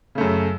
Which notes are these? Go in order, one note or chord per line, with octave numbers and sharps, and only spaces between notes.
F#2 C#3 A3